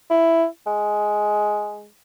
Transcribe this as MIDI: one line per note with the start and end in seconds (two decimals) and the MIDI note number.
0.10 0.46 64
0.67 1.87 56